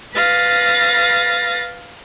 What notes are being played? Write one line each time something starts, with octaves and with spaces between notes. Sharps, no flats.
B4 F5 A6 A#6